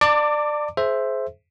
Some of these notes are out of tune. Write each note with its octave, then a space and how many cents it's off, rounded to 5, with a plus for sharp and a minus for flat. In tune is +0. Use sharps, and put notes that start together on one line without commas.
D5 +20 A5 +40 D6 +0
G#4 +35 C5 +0 E5 +5